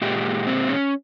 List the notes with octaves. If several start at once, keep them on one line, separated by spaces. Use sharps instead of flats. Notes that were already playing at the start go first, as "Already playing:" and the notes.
A#2 G#3 G4
C4
C#4